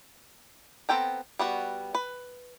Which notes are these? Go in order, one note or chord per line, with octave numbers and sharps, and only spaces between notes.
B3 C4 A4 G5 A#5
G3 B3 F#4
B4